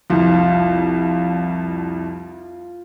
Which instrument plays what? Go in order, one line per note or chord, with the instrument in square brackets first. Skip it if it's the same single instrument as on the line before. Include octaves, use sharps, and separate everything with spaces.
[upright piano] C2 F2 [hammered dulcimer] F4